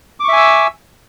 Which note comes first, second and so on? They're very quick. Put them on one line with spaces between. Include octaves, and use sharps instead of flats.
D6 C#6 E5 G#5 E6